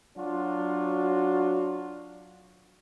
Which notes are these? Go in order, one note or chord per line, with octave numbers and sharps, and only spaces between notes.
F#3 D4 F4 F#4